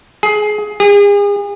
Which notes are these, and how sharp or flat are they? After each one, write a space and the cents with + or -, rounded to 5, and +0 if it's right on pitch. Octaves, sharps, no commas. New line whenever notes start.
G#4 +20
G#4 -40